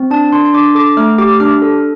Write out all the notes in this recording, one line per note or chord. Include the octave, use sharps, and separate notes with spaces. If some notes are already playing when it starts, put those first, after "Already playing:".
Already playing: C4
D4 A5
D4 C6
C6
D4 D6
A4 D6
A3 F6
G4 D6
D4 F6
A4